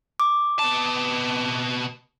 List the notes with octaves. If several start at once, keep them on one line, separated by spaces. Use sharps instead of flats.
D6
B2 A5